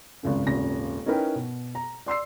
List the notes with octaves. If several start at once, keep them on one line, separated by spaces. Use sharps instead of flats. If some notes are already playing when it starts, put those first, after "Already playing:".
G#1 C#2 F#2
D#1 G#1 C#3 A#6
C#4 D#4 E4 A#4 B4 G5
B2
A#5
D5 C6 E6 C7